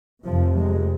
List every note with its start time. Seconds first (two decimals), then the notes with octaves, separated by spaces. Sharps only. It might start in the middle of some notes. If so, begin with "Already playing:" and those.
0.24 F1 F2 C3 F3
0.57 G#3